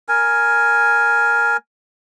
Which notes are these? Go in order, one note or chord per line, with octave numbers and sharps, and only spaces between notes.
A#4 G#5